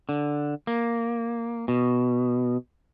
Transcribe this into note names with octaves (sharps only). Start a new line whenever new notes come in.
D3
A#3
B2